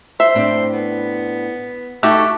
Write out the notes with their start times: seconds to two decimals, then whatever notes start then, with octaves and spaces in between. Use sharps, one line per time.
0.20 C5 E5
0.35 A2 C4 D4
0.73 B3
2.03 A3 D#4 F#4 G4 A4